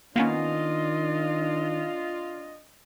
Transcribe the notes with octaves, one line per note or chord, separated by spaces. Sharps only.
D#3 A#3 B3 C#4 D4 F4 D#5